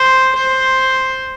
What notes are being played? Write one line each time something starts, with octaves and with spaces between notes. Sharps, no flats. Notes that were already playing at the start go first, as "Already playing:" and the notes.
Already playing: C5
C5